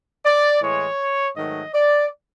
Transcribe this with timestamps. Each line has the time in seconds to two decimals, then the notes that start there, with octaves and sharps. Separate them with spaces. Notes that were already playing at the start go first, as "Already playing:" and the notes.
0.25 D5
0.62 A2 E3 G#3 C#5
1.36 G#2 D#3 F#3 A3 D#5
1.74 D5